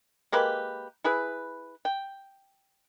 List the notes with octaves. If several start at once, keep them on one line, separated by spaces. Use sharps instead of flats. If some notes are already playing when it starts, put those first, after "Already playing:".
G#3 A#3 G4 B4
E4 G#4 B4
G5